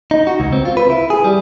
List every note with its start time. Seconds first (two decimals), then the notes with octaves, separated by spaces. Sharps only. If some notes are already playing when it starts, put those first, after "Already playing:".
0.11 D#4
0.27 F#4
0.40 C#2
0.52 C4
0.65 F4
0.77 B4
0.90 E4
1.10 G#4
1.24 G3